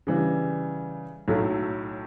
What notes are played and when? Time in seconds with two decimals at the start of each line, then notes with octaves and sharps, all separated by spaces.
0.07 C#3 E3 G3
1.28 B1 A2 F#3 A3